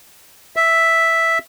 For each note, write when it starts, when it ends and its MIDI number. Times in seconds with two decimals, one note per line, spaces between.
0.56 1.38 76